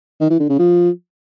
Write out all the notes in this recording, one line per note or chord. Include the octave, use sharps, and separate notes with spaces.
D#3
E3
D3
C#3
F3